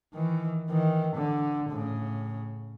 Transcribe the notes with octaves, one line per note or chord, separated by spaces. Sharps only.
D#3 E3
D#3 E3
D3
A2 C#3